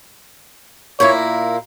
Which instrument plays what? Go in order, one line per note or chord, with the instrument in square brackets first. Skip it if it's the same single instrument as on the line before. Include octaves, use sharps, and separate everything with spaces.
[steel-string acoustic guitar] A#2 A#3 E4 [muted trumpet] C#5